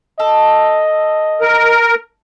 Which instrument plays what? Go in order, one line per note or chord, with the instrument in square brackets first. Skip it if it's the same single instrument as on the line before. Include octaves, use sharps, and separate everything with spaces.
[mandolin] A4 [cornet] D#5
[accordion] A#4